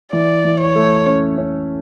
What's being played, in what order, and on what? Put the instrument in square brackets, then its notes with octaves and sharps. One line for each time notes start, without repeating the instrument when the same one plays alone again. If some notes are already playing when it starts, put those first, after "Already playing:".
[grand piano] E3 [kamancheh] D5
[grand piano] E3
[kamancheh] C#5
[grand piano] A3
C#4
C#4